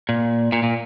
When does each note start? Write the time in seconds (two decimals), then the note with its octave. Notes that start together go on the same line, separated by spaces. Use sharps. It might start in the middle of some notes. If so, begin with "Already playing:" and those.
0.09 A#2
0.52 A#2
0.63 A#2